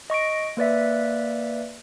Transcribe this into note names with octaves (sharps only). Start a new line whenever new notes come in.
D#5 C#6 A#6 D7
A#3 B4 D5 E5